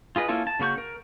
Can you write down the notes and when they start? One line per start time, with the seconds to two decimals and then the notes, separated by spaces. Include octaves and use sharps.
0.16 F4 G#4 B4 D#5
0.28 A#3 C#4 E4 F4 A4
0.47 A5
0.60 C#3 A#3 F#4 C#6 G6
0.78 A#4